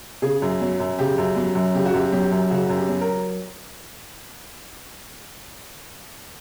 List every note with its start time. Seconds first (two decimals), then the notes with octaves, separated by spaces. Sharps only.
0.22 C#3 G#4
0.42 F#2
0.61 F#3
0.80 F#2
0.99 C#3 G4
1.18 F#2
1.36 F#3
1.55 F#2
1.75 C#3 G4
1.85 F#4
1.94 F#2 G4
2.12 F#3 G4
2.32 F#2
2.50 C#3 F#4
2.70 F#2
2.76 G4
2.89 F#3
3.01 A#4